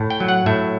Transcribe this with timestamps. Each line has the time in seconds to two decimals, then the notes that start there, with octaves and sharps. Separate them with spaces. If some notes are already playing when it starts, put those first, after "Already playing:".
Already playing: A2
0.10 G5
0.20 F#3
0.28 F#5
0.46 A2 E5